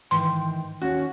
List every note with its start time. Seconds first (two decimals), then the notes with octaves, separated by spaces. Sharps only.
0.11 G#2 D#3 E3 G5 C6
0.82 D#2 C#4 F#4